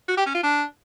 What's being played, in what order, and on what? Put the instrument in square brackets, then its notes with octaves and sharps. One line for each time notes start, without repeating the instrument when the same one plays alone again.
[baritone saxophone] F#4
G4
C#4
F4
D4